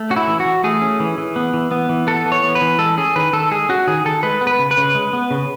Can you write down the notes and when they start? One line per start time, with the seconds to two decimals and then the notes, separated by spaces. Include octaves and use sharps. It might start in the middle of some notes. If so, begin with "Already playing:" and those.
Already playing: A3
0.10 C#4 F#4
0.16 E4
0.27 E3
0.40 F#4
0.45 E3
0.64 A3 G#4
0.82 C#4
1.00 E3
1.18 E3
1.36 B3
1.54 E3
1.71 B3
1.89 E3
2.07 B3 A4
2.26 E3
2.32 C#5
2.44 B3
2.55 B4
2.62 E3
2.79 G#3 A4
2.97 C#4 G#4
3.16 D#3 B4
3.33 D#3 A4
3.51 G#3 G#4
3.69 C#4 F#4
3.88 D#3 G#4
4.05 D#3 A4
4.23 G#3 B4
4.41 B3
4.47 B4
4.59 C#3
4.71 B4
4.77 C#3
4.95 G#3
5.13 B3
5.31 C#3